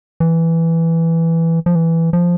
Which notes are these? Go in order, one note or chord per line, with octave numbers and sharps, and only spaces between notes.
E3
F3
E3
F3